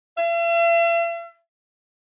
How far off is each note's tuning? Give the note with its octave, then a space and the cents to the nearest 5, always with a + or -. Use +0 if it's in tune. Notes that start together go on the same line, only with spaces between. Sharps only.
E5 +45